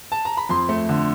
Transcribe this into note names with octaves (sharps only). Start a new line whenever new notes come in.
A5
A#5
B5
F2 C6
A3
D3